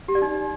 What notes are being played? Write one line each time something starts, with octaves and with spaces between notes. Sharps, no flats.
G4
D5
D#4